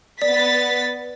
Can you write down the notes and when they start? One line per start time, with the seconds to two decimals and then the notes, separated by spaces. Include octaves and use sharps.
0.22 B3 D5 A6 B6